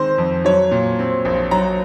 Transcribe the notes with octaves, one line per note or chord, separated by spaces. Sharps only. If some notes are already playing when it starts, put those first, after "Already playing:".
Already playing: D#3 G#3 C4 C5
F2
F#3 C#5
A#2
C4
A#1
F#3 A#5